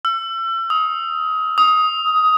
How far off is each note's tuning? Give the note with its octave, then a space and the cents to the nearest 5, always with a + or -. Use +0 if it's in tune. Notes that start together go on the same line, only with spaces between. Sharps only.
E6 +35
D#6 +30
D#6 +15